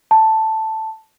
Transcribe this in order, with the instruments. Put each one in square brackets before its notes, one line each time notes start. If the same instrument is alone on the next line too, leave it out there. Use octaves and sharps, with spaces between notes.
[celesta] A5